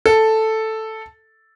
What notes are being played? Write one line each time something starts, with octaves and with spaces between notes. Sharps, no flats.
A4